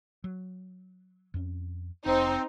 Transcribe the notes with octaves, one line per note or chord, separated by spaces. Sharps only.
F#3
F2 C#4
F1 C4 D#4 C5